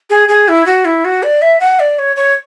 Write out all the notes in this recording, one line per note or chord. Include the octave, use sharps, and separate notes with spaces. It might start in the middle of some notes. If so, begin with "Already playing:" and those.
G#4
G#4
E4
F#4
E4
F#4
D5
E5
F#5
D5
C#5
C#5